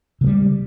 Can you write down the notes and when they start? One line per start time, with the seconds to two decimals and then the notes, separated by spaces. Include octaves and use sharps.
0.21 C#3
0.24 G#3
0.26 G3